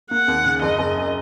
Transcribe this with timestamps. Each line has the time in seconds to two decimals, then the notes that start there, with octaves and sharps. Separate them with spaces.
0.11 A#3 F#5
0.28 D#2
0.45 C#3
0.62 F#1 D#5
0.79 F#1
0.96 F#2